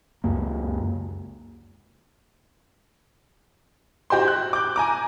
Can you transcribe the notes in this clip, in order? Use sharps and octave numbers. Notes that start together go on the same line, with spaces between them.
C#2 F#2 A#3
F#4 G4 C5 C6
F#6
D6 G6
G#5 A#5 D6